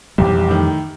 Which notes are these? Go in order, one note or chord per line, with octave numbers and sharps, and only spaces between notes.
B1 F2 E3 G3 G4
A2 D#3